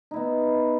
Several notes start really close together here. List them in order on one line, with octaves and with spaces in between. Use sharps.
D#4 E4 B3